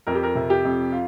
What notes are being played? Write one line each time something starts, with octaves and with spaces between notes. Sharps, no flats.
F2 A#4
G4
A#4
C3
G4
F2
F4